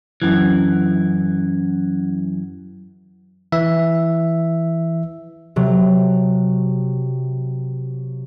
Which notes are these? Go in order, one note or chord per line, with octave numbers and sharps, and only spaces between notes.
F#2 E3
E3 E5
C3 F#3